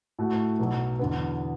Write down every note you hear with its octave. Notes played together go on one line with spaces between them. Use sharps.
A2 A3 F#4
B1 B2 F#3
E2 D3 B3